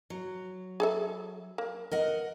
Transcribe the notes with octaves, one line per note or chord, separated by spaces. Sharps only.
F#3
G#4 A4 E5
A#3
A#4 D#5 F#5